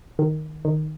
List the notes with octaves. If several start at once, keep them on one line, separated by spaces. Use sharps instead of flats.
D#3
D#3